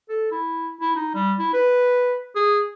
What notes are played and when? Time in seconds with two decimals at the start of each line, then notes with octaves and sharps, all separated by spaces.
0.09 A4
0.32 E4
0.81 E4
0.96 D#4
1.15 G3
1.39 E4
1.54 B4
2.36 G#4